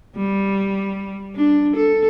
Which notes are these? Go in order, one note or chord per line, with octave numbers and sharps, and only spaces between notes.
G3
D4
A4